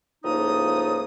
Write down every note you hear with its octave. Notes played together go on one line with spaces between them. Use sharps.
C#2 A2 F3 A#3 D#4 D#6